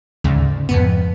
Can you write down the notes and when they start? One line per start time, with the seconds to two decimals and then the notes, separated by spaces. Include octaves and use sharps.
0.24 D2 G#2 C#3
0.69 F2 G#2 B3